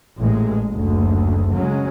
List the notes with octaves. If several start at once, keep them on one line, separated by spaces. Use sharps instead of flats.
A1 A#2 G#3
F#1 D2
C#3 F#3 G#3 C#4